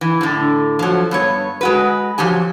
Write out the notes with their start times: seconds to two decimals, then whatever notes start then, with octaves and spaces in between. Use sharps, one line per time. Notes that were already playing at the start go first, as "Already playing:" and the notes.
0.01 E3
0.21 A2 D3
0.79 F3 F#3
1.11 G2 B3 C#5
1.61 G#3 F#4 B4
2.18 F3 F#3 G4 G#5